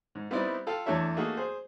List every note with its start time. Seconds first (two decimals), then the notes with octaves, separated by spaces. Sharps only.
0.15 G#2
0.31 G3 B3 C4 D#4 E4 D5
0.67 F4 A4 F5 G5
0.86 E2 A3 D4 A4 C#5 E5
1.17 A3 A#3 D#4 F#4 G#4
1.37 G#4 C5